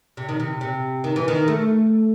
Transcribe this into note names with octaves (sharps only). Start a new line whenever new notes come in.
C3
D#3
C3
C3
D#3
E3
D#3
A3